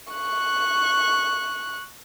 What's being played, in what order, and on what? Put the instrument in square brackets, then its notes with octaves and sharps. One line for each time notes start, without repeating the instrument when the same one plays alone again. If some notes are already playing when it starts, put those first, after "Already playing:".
[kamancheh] C#6 F#6